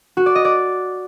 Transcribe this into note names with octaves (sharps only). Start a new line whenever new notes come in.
F#4
D5
D#5
D5